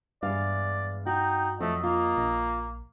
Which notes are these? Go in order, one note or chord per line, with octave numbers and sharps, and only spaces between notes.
E2 G2 G#3 D5 F5
D#4 F#4 G5
F2 F#3 A3 D#5
A#3 F4
A#1